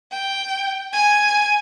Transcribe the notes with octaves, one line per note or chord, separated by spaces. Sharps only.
G5
G#5